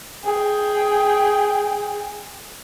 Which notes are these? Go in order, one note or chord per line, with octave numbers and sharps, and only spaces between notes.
G#4 G5